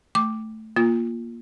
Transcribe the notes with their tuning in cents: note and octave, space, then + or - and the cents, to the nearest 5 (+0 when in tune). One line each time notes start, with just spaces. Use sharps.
A3 +0 D6 +0
A#3 +15 F4 +0